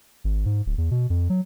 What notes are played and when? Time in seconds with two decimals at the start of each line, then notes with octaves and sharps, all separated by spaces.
0.24 G#1
0.46 G#2
0.66 D1
0.78 E2
0.91 B2
1.10 F2
1.30 F#3